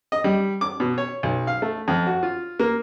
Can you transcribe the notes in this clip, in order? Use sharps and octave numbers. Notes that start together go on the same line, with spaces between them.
D#5
G3
D6
B2
C#5
B1
F5
A3
F2
F#4
F4
A#3